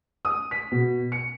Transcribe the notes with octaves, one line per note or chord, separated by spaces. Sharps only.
D#6
B6
B2
C#7